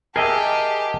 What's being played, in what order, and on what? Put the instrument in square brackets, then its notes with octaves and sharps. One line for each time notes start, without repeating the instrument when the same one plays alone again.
[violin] G4 [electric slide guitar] G#4 D#5 [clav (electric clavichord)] A#4 E5 [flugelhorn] A5